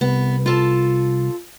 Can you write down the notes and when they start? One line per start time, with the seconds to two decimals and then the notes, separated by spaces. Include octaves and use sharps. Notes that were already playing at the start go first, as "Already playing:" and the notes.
0.01 C2 B3
0.46 F4 A4 A5